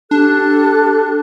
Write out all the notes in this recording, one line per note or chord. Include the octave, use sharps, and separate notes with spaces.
D4 G4 A4 F#6